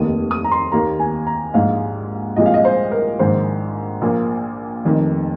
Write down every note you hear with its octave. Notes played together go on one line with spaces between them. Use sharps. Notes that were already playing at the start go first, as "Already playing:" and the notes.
Already playing: F1 D#2 D#3 A#3 D#6
D#6
A#5
C6
D#2 D#3 A#3 A#5
G#5
A#5
A#1 G#2 G#3 F5
C2 A#2 F3 G#3 D#5
F5
D#5
C5
A#4
A#1 G#2 D#3 C5
A#1 A#2 A#3
F1 F2 D#3